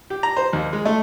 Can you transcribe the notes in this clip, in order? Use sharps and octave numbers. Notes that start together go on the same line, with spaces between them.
G4
A#5
C5
D#2
G#3
A3